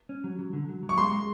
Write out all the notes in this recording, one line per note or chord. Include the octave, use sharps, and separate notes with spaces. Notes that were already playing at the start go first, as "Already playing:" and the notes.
C#4
F#3
F#3
D3
F#3
F#3
C#6
G#3 C6
G#3